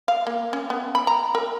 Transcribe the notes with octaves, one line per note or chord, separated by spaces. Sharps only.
F5
A#3
C#4
B3
B5
A#5
A#4